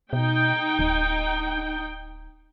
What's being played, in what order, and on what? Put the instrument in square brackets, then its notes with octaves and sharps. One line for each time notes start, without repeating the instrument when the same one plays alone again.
[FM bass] B2 [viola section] D#4 G5
[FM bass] D1